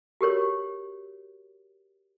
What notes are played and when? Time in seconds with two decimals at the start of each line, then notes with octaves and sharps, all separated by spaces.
0.21 F#4 G4 A#4 C#5